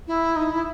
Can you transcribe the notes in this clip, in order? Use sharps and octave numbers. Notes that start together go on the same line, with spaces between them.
E4
D#4
E4